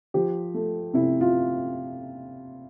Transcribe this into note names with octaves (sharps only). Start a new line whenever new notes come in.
F3 G4
A3
C3 E4
F4